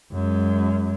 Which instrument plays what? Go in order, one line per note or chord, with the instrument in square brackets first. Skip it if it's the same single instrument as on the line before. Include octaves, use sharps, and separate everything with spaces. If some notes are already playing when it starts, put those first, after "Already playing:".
[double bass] F#2 G#3